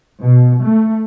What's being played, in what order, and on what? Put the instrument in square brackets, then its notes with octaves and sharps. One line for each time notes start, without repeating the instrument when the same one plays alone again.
[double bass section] B2
A3